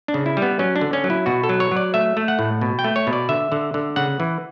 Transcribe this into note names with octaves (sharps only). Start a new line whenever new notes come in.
D4
C#3
E4
G3
B3
F#3 C#4
D4
D3
C#4
F#3
E4
B2 F#4
A4
F#3
C#5
F#3
D5
A3 E5
A3
F#5
A2
B2
G5
A3
C#5
B2
D5
D3 E5
D3
D3
C#3 F#5
E3